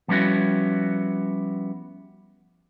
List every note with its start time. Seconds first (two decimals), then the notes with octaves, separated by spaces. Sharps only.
0.08 F3 G3 B3 C#4 E4 F#4